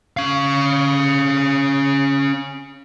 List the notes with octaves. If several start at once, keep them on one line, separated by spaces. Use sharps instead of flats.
C#4 F5